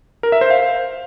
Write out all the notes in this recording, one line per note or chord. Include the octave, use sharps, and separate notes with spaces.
A#4
E5
C5
F5